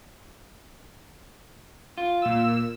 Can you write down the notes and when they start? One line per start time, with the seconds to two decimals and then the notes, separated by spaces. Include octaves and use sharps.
1.98 F4
2.22 A#2 E6